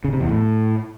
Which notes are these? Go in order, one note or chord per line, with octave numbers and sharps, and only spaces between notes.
C#3
C3
E2
A2